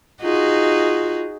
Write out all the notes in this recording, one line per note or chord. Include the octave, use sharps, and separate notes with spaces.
D#4 F4 F#4 G#4